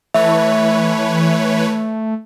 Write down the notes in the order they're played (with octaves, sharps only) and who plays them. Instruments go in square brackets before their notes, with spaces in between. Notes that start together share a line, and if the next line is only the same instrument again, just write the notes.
[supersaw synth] E3 B4 C#5 [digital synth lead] A3 [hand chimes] E5